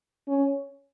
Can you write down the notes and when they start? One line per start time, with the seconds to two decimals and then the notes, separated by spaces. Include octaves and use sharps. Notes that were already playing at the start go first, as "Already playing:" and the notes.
0.28 C#4